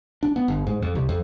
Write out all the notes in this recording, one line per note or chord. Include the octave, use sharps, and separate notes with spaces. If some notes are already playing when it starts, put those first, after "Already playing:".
D4
B3
G1
G#2
F2
C2
F2